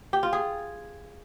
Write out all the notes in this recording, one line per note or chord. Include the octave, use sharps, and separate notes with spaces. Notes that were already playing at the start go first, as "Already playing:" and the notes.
G4
F4
G#4